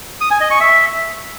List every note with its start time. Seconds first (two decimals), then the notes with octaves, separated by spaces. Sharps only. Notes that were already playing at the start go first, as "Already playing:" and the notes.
0.21 D#6
0.31 G#5
0.41 D#5
0.51 C#6
0.61 E5